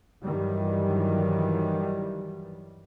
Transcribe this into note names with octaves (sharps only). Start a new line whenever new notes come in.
G2 D#3 E3 F#3 G3